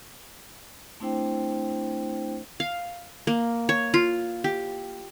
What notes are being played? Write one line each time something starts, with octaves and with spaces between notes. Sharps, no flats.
A3 C4 D4 E4 C5 G5
F5
A#3
C#5
F4
G4